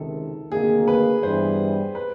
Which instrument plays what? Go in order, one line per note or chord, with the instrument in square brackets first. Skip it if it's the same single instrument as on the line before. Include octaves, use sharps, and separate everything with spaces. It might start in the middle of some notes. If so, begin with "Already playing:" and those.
Already playing: [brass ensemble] C#2 C3 D#3 [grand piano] A4
[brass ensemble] D2 C3 D#3 F#3 A#3 [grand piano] G#4
[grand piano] B4
[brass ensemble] G2 E3 G3 B3 [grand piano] C5
[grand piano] B4